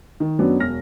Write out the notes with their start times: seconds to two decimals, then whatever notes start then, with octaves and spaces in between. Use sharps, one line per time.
0.20 D#3
0.39 F#2 F#3 B3 D4
0.60 E1 F6 A#6